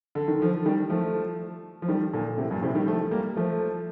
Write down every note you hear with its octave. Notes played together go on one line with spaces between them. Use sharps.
D3
D#3
D3 F3
D#3 G3
F3 A3
F3
D#3 G3
A#2 D3
A2 C3
G2 A#2
A2 C3
D#3 G3
F3 A3
G3 A#3
F3 A3